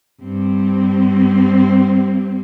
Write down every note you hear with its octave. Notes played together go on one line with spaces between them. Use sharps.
G2 C4